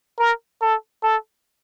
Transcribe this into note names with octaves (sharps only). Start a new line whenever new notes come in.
A#4
A4
A4